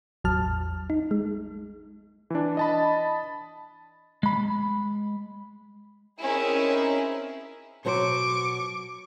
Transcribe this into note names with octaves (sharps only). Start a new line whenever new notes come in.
A1 E2 F#3 A5 F6
D#4
G#3
E3 D4
D#5 A5 B5
G#3 B5
C4 C#4 D#4 E4 G#4 A#4
B2 F#3 C5 C#6 D6